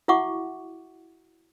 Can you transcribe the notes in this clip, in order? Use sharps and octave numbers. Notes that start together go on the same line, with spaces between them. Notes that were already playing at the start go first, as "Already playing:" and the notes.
E4 F#4 E5 F#5 C#6 D6